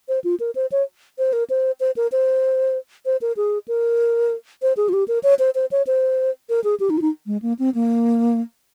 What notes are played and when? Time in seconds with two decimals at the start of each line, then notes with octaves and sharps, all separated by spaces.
0.09 C5
0.24 F4
0.40 A#4
0.55 C5
0.72 C#5
1.19 C5
1.33 A#4
1.50 C5
1.80 C5
1.97 A#4
2.12 C5
3.06 C5
3.22 A#4
3.37 G#4
3.68 A#4
4.62 C5
4.77 G#4
4.89 F4
4.93 G4
5.08 A#4
5.23 C#5
5.39 C5
5.55 C5
5.71 C#5
5.87 C5
6.49 A#4
6.64 G#4
6.80 G4
6.90 D#4
6.98 F4
7.02 D#4
7.26 G#3
7.42 A#3
7.59 C4
7.75 A#3